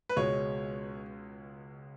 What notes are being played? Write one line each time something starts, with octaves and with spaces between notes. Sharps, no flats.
B4
C#2 B2 G#3 C#5